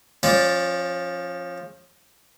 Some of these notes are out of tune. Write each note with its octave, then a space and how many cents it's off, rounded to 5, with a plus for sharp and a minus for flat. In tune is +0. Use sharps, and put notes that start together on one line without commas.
F3 +5 C#4 -35 D5 +0